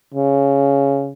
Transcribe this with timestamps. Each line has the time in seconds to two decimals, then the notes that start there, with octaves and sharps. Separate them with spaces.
0.14 C#3